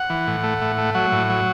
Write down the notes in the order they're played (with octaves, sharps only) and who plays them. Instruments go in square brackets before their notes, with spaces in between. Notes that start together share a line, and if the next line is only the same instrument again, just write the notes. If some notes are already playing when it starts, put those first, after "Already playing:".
Already playing: [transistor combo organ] F#5
E3
A2
A3
A2
A3
F#3 F#5
A2
F#3